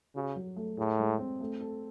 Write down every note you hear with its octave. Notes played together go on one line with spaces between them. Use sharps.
C#3 F#4
F#3
A3
A2 G#4
G#3
C4
A3
A4